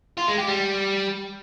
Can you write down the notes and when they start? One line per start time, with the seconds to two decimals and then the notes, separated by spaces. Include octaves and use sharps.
0.18 F4
0.28 G#3
0.38 G4
0.48 G3